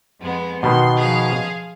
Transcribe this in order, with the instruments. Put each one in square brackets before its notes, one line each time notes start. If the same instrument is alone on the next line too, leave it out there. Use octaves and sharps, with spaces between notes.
[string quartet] F2 G#3 B3
[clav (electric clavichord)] B2 D#3 B3 [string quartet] C6
[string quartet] F3 G#4 F5